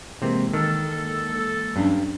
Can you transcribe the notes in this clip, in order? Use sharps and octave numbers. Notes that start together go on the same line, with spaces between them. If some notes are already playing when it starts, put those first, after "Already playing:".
C3 E3 G#3 A#3 C4
D#3 A4
G2 F#3 C#4 D4